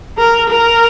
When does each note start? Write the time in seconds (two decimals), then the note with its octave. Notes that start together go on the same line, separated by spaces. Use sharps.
0.17 A#4
0.49 A#4